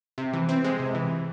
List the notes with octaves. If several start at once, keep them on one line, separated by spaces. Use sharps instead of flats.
C3
E3
C4
G#3
C3
E3